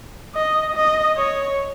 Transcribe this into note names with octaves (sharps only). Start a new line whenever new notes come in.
D#5
D#5
C#5